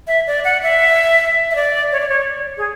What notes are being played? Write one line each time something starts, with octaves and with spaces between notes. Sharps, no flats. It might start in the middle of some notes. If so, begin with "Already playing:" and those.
E5
D5
F#5
E5
E5
D5
C#5
D5
C#5
G#4